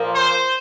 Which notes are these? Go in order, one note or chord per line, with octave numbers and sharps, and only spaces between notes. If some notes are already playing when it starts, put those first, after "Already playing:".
Already playing: A#2 F3 A#3
C5